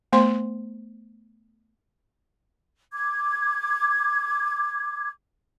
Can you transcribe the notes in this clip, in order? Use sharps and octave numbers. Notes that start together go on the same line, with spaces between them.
A3 B3 C5 C6
D6 G#6